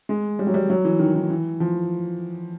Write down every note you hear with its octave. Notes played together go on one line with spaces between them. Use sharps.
G#3
G3
F#3
G3
F#3
E3
D#3
D#3
E3
F3